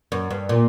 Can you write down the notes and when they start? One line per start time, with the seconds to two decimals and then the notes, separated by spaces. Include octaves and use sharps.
0.12 F#2
0.31 G2
0.49 A#2